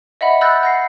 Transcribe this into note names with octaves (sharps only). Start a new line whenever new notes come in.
D#5 E5 F#5 B5
B5 E6 F#6 G6 A6 A#6
F#5 A#6 C7